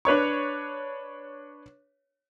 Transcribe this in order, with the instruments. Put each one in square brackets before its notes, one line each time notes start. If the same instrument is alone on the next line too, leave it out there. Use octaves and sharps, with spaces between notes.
[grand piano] D4 B4 C#5 C#6